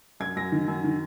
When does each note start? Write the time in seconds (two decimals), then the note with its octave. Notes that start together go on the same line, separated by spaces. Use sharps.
0.20 F#2 G#6
0.36 F#2 A#6
0.52 D#3
0.68 F#2
0.84 D#3